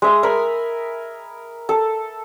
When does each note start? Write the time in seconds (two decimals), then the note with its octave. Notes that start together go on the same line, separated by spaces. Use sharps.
0.02 G#3 E5 D#6
0.23 A#4 G#5 B5
1.69 A4